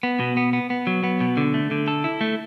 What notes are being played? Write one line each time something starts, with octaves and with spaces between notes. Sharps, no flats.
B3
B2
B3
B3
B3
F#3
B3
B2
D3
A3
D3
A4
E4
A3